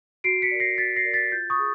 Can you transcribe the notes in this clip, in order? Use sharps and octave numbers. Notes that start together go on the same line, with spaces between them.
F#4 C7 D7
B6 C#7
A#4 D5
A#6 C7
F#4 A6 B6
A#6 C7
A#4 D5
A6 B6
F4 G6 A6
C#6 D#6
G#4